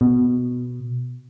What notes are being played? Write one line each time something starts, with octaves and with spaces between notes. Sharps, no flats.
B2